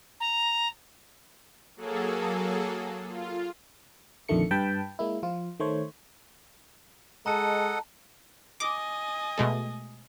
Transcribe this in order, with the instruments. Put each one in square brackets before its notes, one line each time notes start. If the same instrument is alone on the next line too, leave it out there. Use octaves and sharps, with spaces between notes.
[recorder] A#5
[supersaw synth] F#3 A#3 G#4 A4
F4
[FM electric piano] A#1 F2 D3 D#3 A3 C#7
G2 B4 G5 A5 B5
G#3 A#3 E4
F3 F4
D#3 A3 C5 C#5
[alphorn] G#3 [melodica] A4 D#5 F#5 [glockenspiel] A5 A#5
[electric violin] D#5 G#5 [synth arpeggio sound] D6
[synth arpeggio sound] B2 G#3 A3